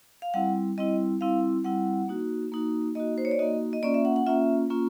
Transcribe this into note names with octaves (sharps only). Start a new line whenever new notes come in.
F5
G3 C4 E4 F#5
G3 C4 E4 D#5
G3 C4 E4 F5
G3 C4 E4 F#5
A#3 D#4 F#4
A#3 D#4 F#4
A#3 D#4 F#4 D#5
C5
C#5
D5
A#3 D#4 F#4 D#5
D#5
A#3 C#4 F4 D5
E5
F#5
F#5
A#3 C#4 F4 E5
A#3 C#4 F4